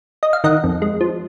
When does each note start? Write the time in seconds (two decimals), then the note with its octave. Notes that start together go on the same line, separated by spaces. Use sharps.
0.23 D#5
0.33 F5
0.44 D#3 D#5 F#5
0.64 F2
0.82 G#3
1.01 F3